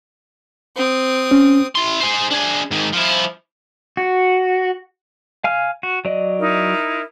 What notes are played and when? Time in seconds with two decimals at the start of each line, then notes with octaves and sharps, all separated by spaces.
0.76 C4 D#6
1.31 C#4
1.75 E4 C6
2.00 G#4 C5
2.31 D4 G#4
2.71 G#2 D#3
2.93 F3 E4
3.97 F#4
5.44 F5 G#5 F6
5.83 F#4
6.05 F#3 D5 D#5
6.39 D#4 E4 A#4